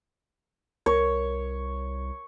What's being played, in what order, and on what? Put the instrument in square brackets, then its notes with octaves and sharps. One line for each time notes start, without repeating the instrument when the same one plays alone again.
[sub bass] C2 [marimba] A#4 [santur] C#5